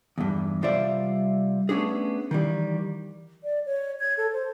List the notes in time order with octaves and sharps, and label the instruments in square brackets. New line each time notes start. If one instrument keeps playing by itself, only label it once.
[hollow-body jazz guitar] E2 G2
C3 G3 F4 C5 D5 E5
A3 B3 C#4 D4 G#4
D#3 E3 G3
[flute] D5
C#5
G#6
A4
C5